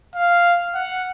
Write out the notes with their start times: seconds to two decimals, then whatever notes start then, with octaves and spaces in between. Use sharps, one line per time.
0.15 F5
0.75 F#5